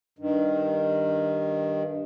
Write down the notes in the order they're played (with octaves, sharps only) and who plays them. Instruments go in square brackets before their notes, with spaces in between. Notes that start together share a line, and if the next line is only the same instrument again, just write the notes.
[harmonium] G2 D#3